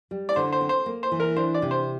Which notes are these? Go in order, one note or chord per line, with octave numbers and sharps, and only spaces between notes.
G3
D5
D3 C5
C5
C4
C5
A#3
C5
E3
A#4
D4 C5
D5
C3
C5